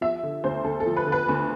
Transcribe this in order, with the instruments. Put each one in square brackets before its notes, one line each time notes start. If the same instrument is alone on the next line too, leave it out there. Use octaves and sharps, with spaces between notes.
[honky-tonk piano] F3 E5
D3
D2 C5
D2 A4
A4
F3
B4
D3
B4
D2